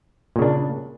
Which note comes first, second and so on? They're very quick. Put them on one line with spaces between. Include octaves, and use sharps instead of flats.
A#2 C#3 D4